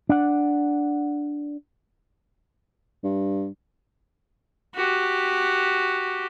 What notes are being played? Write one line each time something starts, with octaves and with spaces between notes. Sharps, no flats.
D4 F#5
G2
F#4 G4